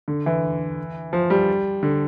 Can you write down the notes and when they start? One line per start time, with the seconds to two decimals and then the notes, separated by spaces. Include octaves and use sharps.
0.08 D3
0.26 E3
1.13 F3
1.30 G3
1.83 D3